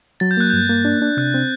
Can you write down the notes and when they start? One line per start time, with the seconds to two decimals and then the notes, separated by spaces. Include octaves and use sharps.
0.20 F#3 A6
0.31 G6
0.37 A#3 F#6
0.50 G2 G6
0.69 A#3
0.85 D4
1.02 D4
1.17 C3 F#6
1.34 C4